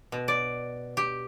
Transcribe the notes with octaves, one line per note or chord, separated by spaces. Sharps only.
B2
D5
G4